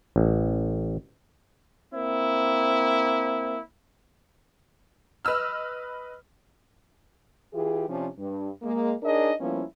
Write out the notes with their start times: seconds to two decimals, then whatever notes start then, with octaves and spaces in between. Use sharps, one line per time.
0.16 A1
1.92 A#3 C4 E4
5.25 B4 D#5 E6 F6
7.54 E3 F4 G4 G#4
7.89 C3 F3 C#4 D4
8.18 G2
8.62 G#3 A#3
9.03 D4 D#4 G#4 A#4 C#5 D#5
9.39 F3 G3 A#3 B3 C#4 E4